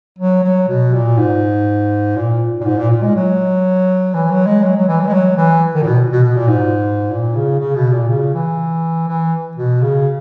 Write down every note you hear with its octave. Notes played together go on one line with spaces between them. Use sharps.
F#3
F#3
B2
A#2
G#2
A#2
A#2
G#2
A#2
A#2
G#3
F#3
E3
F#3
G#3
F#3
F#3
E3
F#3
G#3
F#3
E3
D#3
A#2
B2
B2
B2
A#2
G#2
A#2
C#3
C#3
B2
A#2
C#3
E3
E3
B2
C#3